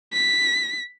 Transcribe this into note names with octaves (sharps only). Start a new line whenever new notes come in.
B6